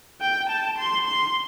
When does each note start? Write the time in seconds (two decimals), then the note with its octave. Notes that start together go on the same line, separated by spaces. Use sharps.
0.21 G5
0.49 A5
0.78 C6
1.07 C6